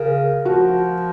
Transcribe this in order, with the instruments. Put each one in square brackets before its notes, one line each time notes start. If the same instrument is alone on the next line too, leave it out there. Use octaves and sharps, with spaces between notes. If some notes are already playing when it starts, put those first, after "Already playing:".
Already playing: [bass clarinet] C#3 [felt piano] A#4
[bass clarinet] F3 [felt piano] F#4